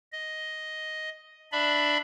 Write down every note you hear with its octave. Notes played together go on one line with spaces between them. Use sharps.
D#5
D4 D5 E5 B5